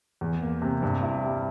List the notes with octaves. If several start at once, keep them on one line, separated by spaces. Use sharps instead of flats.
E2
A#3
C3
G2
E4
G3